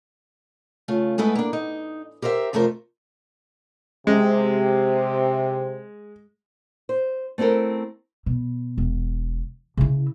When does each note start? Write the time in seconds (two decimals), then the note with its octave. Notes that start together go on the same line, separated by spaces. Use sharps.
0.88 C#3 A3 F4
1.18 G#3 A3 B3 E4 B4
1.35 A#3 D4
1.53 D#4
2.22 G4 A#4 C5 C#5 E5
2.53 F2 C3 A3 F4 A#4 C5
4.07 C3 G#3
6.89 C5
7.38 A3 C4 E4 A4 A#4
8.26 B2
8.78 E1
9.77 C#3 E4